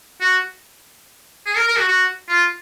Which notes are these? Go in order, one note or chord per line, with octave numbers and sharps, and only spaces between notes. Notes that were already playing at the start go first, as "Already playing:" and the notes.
F#4
G#4
A#4
A#4
F#4
F#4
F4